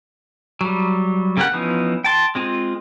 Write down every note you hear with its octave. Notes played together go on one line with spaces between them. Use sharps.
F#3 G3
C#3 A#3 C#4 G4 F#5
E3 F3 B3 C#4 D#4
G5 A5 C6
G#3 C4 F4